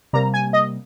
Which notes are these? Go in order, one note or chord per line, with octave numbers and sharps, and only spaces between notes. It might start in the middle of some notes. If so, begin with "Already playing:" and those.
C3 G3 A#3 A#5
G#5
D#5